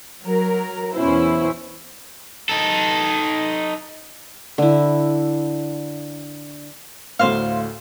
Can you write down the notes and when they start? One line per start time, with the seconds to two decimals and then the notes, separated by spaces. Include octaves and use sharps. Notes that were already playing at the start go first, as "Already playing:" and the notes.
0.23 F#3 A#4
0.95 E2 B2 C#4 E4 C5
2.49 D#4 A4
4.58 D3 E4
7.19 D2 A2 C5 F5